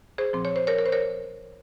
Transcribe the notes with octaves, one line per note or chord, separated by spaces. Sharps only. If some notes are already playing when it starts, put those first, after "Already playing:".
G#4 C5
A#2 F3 C4
C#5
C5
A#4 C#5
A#4
C5
A#4 C#5